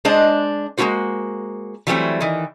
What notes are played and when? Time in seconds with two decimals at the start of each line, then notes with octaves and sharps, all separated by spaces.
0.05 G#3 D4 C5 D#5 A5
0.77 G#3 A#3 C#4 F4 F#4 C5
1.87 E3 F#3 G3 A3 C4
2.20 D#3 E3